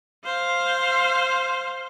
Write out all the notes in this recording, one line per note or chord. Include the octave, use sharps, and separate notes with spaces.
C5 F5